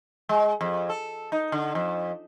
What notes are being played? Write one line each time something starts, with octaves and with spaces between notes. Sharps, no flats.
G#3
F2
A4
D#4
D3
F2